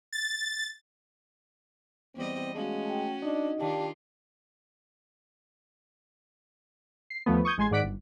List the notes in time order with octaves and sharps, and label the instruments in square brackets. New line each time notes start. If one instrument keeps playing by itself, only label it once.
[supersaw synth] A6
[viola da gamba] E2 G3 D#5 [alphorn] C4
[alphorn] G#3 [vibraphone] A3 F5 [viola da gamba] C#4 F#4
[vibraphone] A3 G5
[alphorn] D4 [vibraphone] D#4 D#5
[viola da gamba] D#3 D4 F4 [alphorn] G4 [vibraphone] D5 F5 A5
[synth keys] C7
D#2 F3 A3 B3
C#6 D#6 G6 G#6
A1 G#3 G#5 C6 G#6
G#2 D#3 D5 F#5 B6 D7
G1